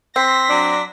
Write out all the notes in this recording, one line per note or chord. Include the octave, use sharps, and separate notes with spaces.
C4 C6 A#6 B6
F#3 D4